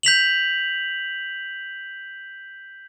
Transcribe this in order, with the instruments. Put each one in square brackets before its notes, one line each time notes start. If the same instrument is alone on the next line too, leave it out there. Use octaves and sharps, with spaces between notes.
[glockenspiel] G6 B6 F7 F#7